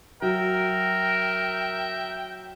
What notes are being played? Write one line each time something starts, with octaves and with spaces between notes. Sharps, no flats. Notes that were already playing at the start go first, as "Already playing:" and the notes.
F#3 A#4 E5 G5